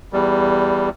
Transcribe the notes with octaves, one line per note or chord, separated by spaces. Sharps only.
E2 G3